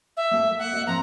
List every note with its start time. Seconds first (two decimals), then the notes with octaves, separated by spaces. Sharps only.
0.17 E5
0.31 A#3 A4
0.58 F#5
0.73 D#5 F5
0.87 G#2 F3 C4 A#5